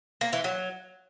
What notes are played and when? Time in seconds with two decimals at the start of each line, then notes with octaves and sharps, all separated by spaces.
0.21 A#3
0.33 E3
0.44 F#3